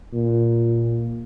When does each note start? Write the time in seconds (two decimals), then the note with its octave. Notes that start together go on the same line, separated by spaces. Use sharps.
0.13 A#2